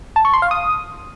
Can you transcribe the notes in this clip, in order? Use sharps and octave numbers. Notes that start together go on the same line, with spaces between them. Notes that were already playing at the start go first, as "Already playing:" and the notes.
A5
C#6
C6
F5
D#6